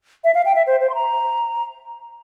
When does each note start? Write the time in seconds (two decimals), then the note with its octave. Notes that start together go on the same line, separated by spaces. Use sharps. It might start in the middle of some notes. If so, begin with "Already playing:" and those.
0.24 E5
0.35 F5
0.45 G5
0.55 E5
0.67 C5
0.81 C5
0.90 C6
0.95 A#5